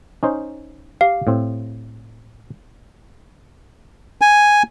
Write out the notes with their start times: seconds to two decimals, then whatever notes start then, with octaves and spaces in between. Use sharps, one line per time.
0.23 C#4 D#4 C5
1.01 G4 F5
1.27 A2 C4
4.21 G#5